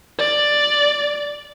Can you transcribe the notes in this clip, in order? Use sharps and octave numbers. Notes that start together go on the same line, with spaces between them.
D5